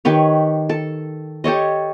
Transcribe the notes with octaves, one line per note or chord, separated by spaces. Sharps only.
D#3 G4 B4 C#5
A4
G4 A4 C#5 D#5